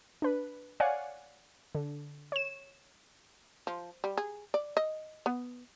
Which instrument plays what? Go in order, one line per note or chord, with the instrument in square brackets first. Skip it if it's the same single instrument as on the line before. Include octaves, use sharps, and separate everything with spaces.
[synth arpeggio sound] D4 B4
C#5 D5 F5 F#5 G#5
D3
C#5 E7
[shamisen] F3
G3
G#4
D5
D#5
B3